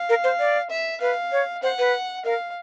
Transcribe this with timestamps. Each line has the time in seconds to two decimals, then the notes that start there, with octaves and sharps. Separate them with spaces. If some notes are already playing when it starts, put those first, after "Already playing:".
Already playing: F5
0.09 A#4
0.24 C5
0.39 D5
0.70 E5
1.01 B4 F5
1.32 C#5
1.63 C5 F#5
1.79 B4
2.25 A#4 F5